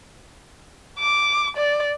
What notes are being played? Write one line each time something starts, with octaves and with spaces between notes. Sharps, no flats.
D6
D5